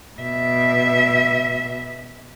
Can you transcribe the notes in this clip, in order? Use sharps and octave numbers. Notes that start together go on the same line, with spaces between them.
B2 E5